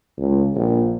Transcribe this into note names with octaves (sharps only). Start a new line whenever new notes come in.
C#2
A#1